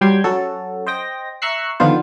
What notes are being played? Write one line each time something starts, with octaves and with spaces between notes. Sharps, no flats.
F#3 G3 G5 C6 G#6
F#3 C#4 F#4 A4
C5 D#5 G5 A#6
E5 A#5 C#6 E6 F#6 C7
D3 D#3 F3 B3 F4 C5